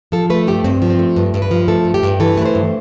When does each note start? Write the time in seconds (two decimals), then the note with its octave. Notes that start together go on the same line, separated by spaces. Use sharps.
0.12 F3 A4
0.30 A3 B4
0.47 G2 G4
0.64 G2 C4
0.82 F3
0.90 C4
0.99 A3
1.16 G2
1.34 G2
1.42 B4
1.51 F3
1.68 A3 A4
1.85 G2
1.94 G4
2.03 G2
2.20 E3 A4
2.37 A3 B4
2.46 C5
2.55 G2